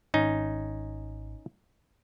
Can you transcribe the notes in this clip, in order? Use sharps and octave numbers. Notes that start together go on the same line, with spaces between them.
G#1 C#4 D#4